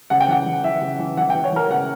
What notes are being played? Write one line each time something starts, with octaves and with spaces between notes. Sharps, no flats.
C#3 F#5
G5
E3 F#5
E3
E3 E5
C#3
E3
E3 F#5
G5
E3
C#5
E3 A#4
C#3 F#5